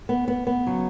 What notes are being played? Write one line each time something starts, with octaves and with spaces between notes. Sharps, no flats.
B3
B3
B3
C#3 F#3